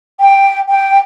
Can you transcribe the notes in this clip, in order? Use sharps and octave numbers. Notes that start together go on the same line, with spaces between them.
G5
G5